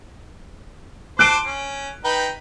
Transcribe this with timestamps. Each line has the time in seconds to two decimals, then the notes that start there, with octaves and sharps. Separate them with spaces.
1.19 C5 A5 D6 F#6 D7
1.46 C#4
2.05 D#4 B4 G5